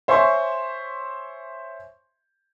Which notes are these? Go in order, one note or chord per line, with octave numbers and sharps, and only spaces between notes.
C5 C#5 E5 G#5 C6 C#6